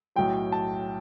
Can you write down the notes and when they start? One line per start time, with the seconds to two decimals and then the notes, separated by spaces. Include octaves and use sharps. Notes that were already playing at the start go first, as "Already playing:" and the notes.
0.16 B1 A2 F#3 G5
0.52 A5